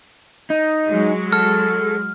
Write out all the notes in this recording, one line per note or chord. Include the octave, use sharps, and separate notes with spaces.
D#4
F#3 G#3
A4 F6